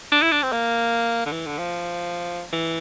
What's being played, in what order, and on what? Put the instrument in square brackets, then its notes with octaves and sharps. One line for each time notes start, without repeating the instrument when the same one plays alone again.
[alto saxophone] D4
E4
D4
C4
A#3
D3
E3
D3
F3
E3